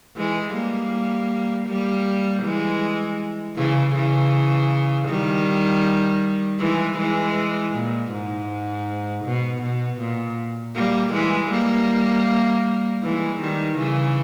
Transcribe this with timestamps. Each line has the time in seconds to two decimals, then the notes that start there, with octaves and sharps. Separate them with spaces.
0.16 E3 G#3
0.54 G3 A#3
1.67 G3 A#3
2.43 E3 G#3
3.57 C#3 E3
3.94 C#3 E3
5.08 D#3 G3
6.60 E3 G#3
6.98 E3 G#3
7.74 A#2
8.12 G#2
9.25 B2
9.62 B2
10.00 A#2
10.75 G3 A#3
11.13 E3 G#3
11.51 G3 A#3
13.03 E3 G#3
13.41 D#3 G3
13.78 C#3 E3